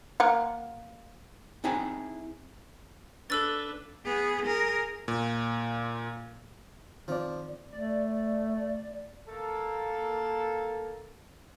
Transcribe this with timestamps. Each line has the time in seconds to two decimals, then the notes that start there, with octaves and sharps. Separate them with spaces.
0.20 A#3 A#4 F#5
1.64 C4 D#4 E4 G#4 G#5 A5
3.30 D4 A4 B4 E6 A6
4.05 B3 G#4
4.46 G#4 A#4
5.08 A#2
7.08 D#3 F3 C4 D5
7.72 A3 D5
9.28 A#3 A4